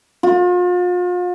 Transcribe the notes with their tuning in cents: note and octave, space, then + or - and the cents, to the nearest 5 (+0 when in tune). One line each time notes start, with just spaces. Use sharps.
F4 +40